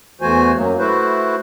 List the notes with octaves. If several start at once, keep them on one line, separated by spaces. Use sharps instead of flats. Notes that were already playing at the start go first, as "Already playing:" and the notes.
E2 E3 A3 F#4 C5 G#5
F#2 F#3 A#3
A3 E4 F#4 B4 C5